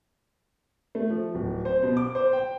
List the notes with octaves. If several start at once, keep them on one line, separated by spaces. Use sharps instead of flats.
A3
F3
D1
C5
B2
D6
C5
G5